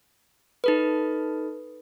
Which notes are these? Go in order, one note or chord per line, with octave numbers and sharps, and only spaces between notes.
D#4 A4 B4